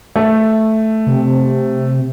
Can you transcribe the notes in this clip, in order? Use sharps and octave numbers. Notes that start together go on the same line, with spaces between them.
A3
C3